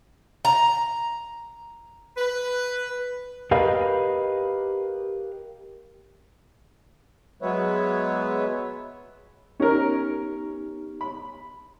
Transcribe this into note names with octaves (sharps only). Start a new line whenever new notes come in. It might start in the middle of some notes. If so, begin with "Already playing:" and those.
A#5
B4
G4 A#4 B4 D#5 F5
F#3 G#3 B3 B4 C#5 E5
B3 C#4 D#4 G4 A#4
B5